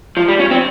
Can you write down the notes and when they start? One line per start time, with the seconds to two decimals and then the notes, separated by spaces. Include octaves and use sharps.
0.17 F3
0.28 G3
0.39 C#4
0.51 C4